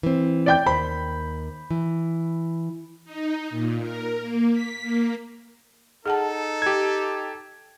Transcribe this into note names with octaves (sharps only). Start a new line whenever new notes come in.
E3 C4
D5 G5 G6
D#2 C5 B5
E3
D#4
A#2
A#4
A#3
B6
A#3
D#4 G#4 A4 F#5 A5
G4 G#6